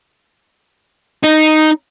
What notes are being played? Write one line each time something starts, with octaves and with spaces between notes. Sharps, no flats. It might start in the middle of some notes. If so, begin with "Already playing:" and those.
D#4